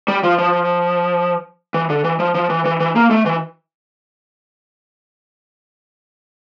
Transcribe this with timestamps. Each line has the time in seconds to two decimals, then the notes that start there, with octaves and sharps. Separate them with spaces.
0.08 G3
0.23 F3
0.38 F3
1.74 E3
1.90 D3
2.04 E3
2.20 F3
2.35 F3
2.50 E3
2.65 E3
2.80 E3
2.96 A#3
3.11 A3
3.26 E3